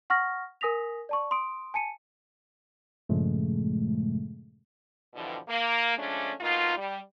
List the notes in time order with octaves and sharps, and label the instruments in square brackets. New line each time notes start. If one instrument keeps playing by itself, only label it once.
[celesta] F#5 C#6 F6 A#6
A#4 G#5 D#6 A#6 B6 F7
D5 A5 C#6
C6 D#6 D7
G#5 A5 C#7 D#7
[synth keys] G2 A#2 C#3 F3 G#3 A3
[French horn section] G2 B2 D3 E3 F3 G3
A#3
F3 G#3 A3 C#4 D4
B2 A#3 D#4 F4
G3